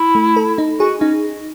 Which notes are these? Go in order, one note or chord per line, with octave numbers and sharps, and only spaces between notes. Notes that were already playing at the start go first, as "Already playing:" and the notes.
Already playing: E4
A3
A4
D#4
F#4 G#4
C#4 D#4